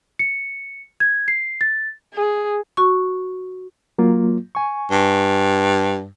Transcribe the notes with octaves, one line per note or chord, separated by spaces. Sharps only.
C#7
G#6
C7
A6
G#4
F#4 C#6
F#3 A#3 F4
G#5 C#6
G2